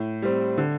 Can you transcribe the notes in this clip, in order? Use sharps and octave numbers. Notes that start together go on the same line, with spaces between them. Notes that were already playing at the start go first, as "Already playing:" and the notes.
Already playing: A2
G3 C4
D3